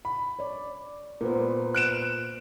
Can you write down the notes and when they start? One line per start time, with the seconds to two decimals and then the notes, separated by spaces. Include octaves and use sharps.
0.05 B5
0.39 C#5 D5
1.21 A#2 B3 A#4 C5
1.75 F#6 D7 E7